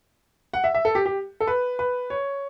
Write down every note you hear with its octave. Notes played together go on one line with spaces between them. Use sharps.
F#5
E5
E5
A4
G4
G4
A4
B4
B4
C#5